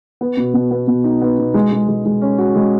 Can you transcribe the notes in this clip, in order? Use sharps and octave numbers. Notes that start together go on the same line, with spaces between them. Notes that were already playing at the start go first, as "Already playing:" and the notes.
B3
B2
B2
B3
B2
D#4
B3
B2
G#3
G#3
G#3
G#3
C#4
F#4
G#3